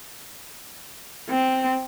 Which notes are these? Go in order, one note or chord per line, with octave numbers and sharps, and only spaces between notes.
C4